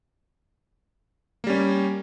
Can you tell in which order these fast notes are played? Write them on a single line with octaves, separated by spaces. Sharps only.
A#3 G3 C#4